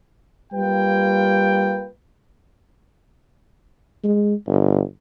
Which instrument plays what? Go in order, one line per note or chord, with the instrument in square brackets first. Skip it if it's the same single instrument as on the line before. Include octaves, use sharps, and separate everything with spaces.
[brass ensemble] G3 A#3 F4 B4 G5
[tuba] G#3
G1